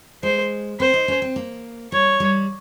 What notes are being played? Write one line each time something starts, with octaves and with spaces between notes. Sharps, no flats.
G#3 C5
C4 C5
D#4
C#4
C4
A#3
G3 C#5
G3